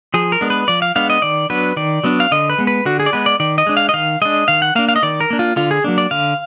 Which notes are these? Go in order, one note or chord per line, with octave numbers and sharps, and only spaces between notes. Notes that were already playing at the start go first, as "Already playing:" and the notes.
F3 G#4
A#4
G#3 B3 D4
B4
F3 D5
F5
G#3 B3 D4 F5
D#5
D#3 D5
F#3 B3 D4 B4
D#3 D5
F#3 B3 D4
F5
D3 D#5
B4
G#3 B3
B4
D3 F#4
G#4
D5
G#3 B3 B4
D5
D#3 D5
D#5
G#3 D4
F5
D#5
D#3 F5
G#3 D4 D#5
D#3 F5
F#5
A#3 D4 F5
F5
D#5
D#3 D5
A#4
A#3 D4
F4
D3 F4
G#4
F#3 A#3 D4
D5
D3 F5